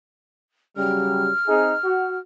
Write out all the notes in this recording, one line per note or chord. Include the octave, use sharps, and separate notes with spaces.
C#3 F#3 G3 F6
C4 D#4 G#4
F#4